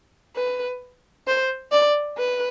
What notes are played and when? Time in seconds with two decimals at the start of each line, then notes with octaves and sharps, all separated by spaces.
0.36 B4
1.27 C5
1.72 D5
2.17 B4